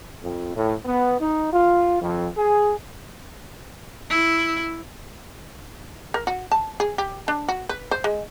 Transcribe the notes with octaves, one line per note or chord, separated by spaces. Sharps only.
F2
A2
B3
D#4
F4
F2
G#4
E4
A#4
F#4
A5
G#4
G4
D4
F#4
B4
C5
G#3